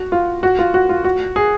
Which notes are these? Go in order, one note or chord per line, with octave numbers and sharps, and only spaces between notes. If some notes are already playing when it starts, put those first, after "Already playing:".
Already playing: F#4
F4
F#4
F4
F#4
F4
F#4
G#4